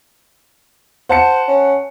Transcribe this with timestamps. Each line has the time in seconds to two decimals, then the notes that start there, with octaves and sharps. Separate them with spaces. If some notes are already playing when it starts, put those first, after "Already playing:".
1.09 C5 F#5 A5 C#7
1.48 C#4